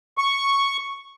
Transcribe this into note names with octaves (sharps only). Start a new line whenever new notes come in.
C#6